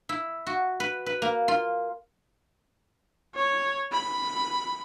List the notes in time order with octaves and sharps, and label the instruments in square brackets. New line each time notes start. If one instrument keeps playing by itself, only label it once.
[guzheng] E4
F#4
B4
B4
A#3
F4
[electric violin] C#5
B5